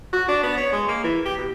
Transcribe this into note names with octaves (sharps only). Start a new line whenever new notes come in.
F#4
D4
B3
C#5
G#3
A#3
E3
G4
B2